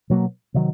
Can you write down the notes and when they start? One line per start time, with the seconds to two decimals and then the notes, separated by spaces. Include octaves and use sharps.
0.10 B2 F#3 A#3
0.54 C3 D#3 F#3